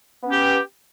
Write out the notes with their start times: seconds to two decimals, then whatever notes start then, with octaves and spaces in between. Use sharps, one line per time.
0.22 B3
0.26 C#4
0.30 G4